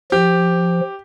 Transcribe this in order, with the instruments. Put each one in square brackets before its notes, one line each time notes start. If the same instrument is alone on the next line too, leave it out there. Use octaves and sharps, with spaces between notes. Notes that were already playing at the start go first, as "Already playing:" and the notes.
[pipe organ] F3 [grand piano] G4